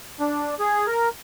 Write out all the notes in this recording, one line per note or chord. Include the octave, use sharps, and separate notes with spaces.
D4
G#4
A#4